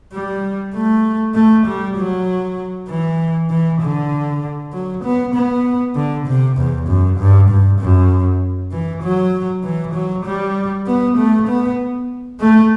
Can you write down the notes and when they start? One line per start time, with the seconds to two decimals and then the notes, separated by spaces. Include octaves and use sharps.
0.13 G3
0.74 A3
1.35 A3
1.67 G3
1.96 F#3
2.89 E3
3.50 E3
3.81 D3
4.73 F#3
5.04 B3
5.35 B3
5.95 D3
6.27 C3
6.57 E2
6.88 F#2
7.19 G2
7.49 G2
7.80 F#2
8.72 E3
9.02 F#3
9.64 E3
9.94 F#3
10.25 G3
10.87 B3
11.17 A3
11.48 B3
12.40 A3